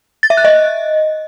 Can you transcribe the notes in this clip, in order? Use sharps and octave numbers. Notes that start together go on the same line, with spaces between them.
A6
E5
F#6
D#5